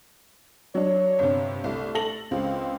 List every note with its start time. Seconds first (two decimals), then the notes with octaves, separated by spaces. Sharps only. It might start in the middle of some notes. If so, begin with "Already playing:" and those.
0.75 F#3 D4 C#5
1.19 G1 C3
1.64 C2 A3
1.95 A4 A#6 F#7
2.31 C#2 C4